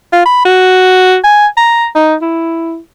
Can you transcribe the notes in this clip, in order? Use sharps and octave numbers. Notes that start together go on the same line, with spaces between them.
F4
B5
F#4
G#5
A#5
D#4
E4